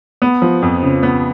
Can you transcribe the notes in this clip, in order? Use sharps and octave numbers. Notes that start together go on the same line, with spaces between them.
B3
F3
F2
C#3
B3